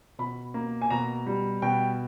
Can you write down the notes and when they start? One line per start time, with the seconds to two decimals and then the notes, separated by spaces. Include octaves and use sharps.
0.19 B2 B5
0.54 A#3
0.81 G#5
0.90 B2 A#5
1.26 G3
1.62 B2 G5